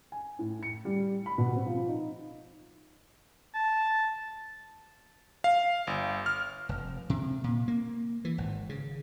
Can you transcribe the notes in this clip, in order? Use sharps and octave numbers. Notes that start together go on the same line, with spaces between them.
G#5
A2
C#7
G3
B5
B2
C4
F3
D#4
A5
F5
G1
F6
F1
C3
A#2
A#3
E3
G#1
C#3